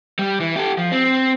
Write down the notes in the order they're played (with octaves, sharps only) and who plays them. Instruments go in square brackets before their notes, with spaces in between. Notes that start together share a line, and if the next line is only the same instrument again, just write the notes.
[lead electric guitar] G3
E3
G4 A4
F3
C4